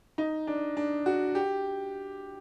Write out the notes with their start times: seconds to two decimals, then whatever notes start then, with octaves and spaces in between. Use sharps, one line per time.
0.18 D#4
0.47 D4
0.77 D4
1.06 F#4
1.35 G4